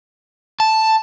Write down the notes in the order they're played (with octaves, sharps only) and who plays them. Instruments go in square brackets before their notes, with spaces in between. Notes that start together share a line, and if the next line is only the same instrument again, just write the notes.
[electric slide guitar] A5